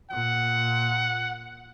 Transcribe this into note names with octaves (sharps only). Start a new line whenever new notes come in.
A#2 F#5